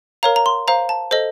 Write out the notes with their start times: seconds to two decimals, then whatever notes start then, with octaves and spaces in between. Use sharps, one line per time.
0.23 A#4 C#5 F5 A#5
0.36 A#5
0.46 C6
0.68 C5 F5 A#5
0.89 A5
1.11 A4 C5 D#5